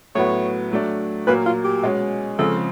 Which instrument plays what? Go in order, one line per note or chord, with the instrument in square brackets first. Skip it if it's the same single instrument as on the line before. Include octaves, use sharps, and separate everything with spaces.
[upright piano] A2 F#3 B3 [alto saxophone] C#5
[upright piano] F#3 A3 D4
[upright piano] A#2 F#3 A#3 [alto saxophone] B4
[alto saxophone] F4
G4
[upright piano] B2 G#3 C#4
[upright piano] C#3 F3 G#3 C4 [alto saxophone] A4